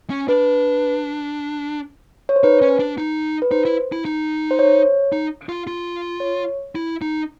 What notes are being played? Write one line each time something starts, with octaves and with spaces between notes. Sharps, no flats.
C#4
D4 B4
C#5
C5
D#4 B4
C#4
D4
D#4
B4
D#4 C5
E4
E4
D#4
C5
C#5
D#4
F4
F4
C#5
E4
D#4